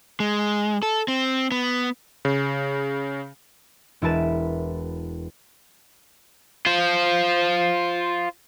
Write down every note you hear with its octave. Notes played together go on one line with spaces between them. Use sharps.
G#3
A4
C4
B3
C#3
E1 E4 A#4 B4 A5 E7
F4 C5